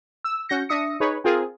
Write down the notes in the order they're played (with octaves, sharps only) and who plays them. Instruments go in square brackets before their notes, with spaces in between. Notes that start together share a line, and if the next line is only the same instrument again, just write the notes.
[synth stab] E6
C#4 F#4 G6 A#6 C#7
D4 E5 D#6 A#6 C#7
D#4 G#4 B4 C#5
C4 F4 G#4 A#4